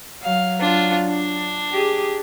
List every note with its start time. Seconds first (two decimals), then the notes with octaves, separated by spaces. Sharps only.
0.23 F#3 F5
0.60 D4 F4
1.07 D4
1.72 G4 G#4